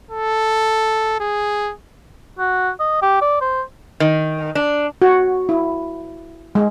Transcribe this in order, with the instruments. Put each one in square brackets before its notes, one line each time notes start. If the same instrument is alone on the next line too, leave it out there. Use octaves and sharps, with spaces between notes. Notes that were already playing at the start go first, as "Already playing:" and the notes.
[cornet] A4
G#4
[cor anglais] F#4
D#5
G4
D5
C5
[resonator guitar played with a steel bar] D#3
D4
[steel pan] F#4
E4
G#3